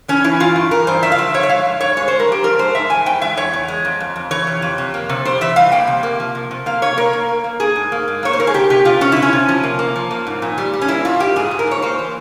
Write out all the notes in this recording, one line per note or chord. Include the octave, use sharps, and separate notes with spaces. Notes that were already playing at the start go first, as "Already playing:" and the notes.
E3 C#4
E3 E4
G2 F4
G2
E3 A#4
G2 C5
G2 E5
F5
F3 E5
F3 C#5
E5
G#3 F5
G2
G2 C#5
G#3 C#5
G#3 C5
A#4
F3 G4
F3 A#4
G#3 C5
G#2 E5
E3 G#5
E2 G5
G#3 E5
E2 C#5
E2
G#3
F2
F2
F2
E3 C#5
C3
F2
C3
A#3
C3
G3 C5
E3 E5
G3 F5
A#3 G5
C3
A#3
F3
C3
C3
A#3 F5
C3 C#5
A#3 A#4
A#3
A#3
A#3
A#3 G#4
G#2
A#3
G#2
A#3 C#5
C5
A#3 A#4
G#4
C3 G4
C3 G4
C3 F4
C3 C#4
C3 E4
C#4
C3
F3
A#3
A#3
F3
A#3
G#2
A#2
G3
G3
C#4
A#3 E4
A#2 F4
A#3 G4
G#2 G#4
G#2
A#4
A#3 C#5
A#3 C5
E3